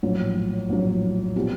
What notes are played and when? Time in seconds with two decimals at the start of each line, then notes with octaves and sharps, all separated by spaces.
0.03 A#1 A2 F#3
0.69 A#1 A2 F#3
1.36 B2 G3 C4 F4